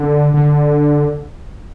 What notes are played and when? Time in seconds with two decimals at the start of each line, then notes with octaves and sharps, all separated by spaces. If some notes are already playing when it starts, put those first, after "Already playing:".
Already playing: D3
0.34 D3